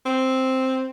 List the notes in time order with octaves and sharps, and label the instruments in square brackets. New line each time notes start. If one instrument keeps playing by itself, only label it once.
[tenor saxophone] C4